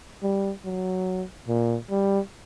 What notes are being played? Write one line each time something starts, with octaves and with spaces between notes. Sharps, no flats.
G3
F#3
A#2
G3